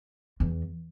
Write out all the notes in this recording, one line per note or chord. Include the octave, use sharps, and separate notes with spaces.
E2